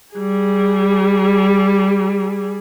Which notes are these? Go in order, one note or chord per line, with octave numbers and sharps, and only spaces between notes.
G3 G#4